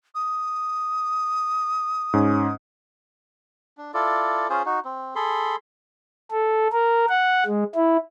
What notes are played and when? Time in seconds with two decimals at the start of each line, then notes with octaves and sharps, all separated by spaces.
0.15 D#6
2.13 G#2 C#4
3.78 D4
3.94 E4 F4 A4 D5
4.50 C#4 F4 G#4 C5
4.66 D#4 F#4
4.85 C4
5.16 G#4 A4 B5 C6
6.31 A4
6.73 A#4
7.09 F#5
7.46 G#3
7.75 E4